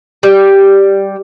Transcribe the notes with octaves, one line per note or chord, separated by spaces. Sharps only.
G3